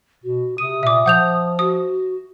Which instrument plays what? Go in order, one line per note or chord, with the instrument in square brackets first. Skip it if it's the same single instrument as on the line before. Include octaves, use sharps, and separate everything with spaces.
[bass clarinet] B2 [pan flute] F#4
[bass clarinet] C3 [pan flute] D#6 [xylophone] D#7
[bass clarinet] A#2 [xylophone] E5 D6
[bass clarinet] F3 [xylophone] F#5 G6 F7
[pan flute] F#4 [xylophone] D#6